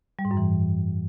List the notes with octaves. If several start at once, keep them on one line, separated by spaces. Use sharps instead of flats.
G3
G#2
F#2
E3